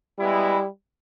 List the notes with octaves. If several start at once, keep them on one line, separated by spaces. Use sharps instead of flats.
G3 G#3 B3 E4